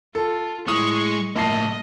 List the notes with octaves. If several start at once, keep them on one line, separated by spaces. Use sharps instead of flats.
F4 A4
A2 G#3 C#6 D#6
A#1 A2 A#3 D#5 A5 C7